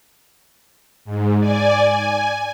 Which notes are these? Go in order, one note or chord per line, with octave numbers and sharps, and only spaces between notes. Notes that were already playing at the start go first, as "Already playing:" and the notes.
G#2
D5 G#5
G#5